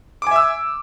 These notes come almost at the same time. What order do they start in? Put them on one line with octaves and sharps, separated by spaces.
D6 G#5 E5 E6